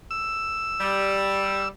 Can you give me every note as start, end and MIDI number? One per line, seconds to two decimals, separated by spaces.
0.11 1.68 88
0.81 1.68 55